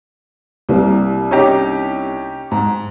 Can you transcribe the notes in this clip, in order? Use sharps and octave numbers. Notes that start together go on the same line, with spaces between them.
C2 G3 A#3
C#4 D#4 G4
G#2